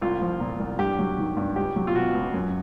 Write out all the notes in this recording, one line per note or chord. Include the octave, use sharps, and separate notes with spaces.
C2 F4
F3
A#2
C2
G2 G4
F#3
D#3
G2
C#2 G4
F#3
F4
B2 F#4
C#2
F#2